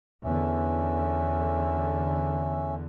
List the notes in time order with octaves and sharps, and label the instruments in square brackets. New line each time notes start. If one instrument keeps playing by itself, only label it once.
[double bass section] E2 D3 [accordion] C#4 E5